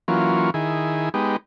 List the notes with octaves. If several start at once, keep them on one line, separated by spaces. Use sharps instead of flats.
E3 F#3 A#3 C#4 F4
D#3 E4 G#4
G#3 B3 D#4 G4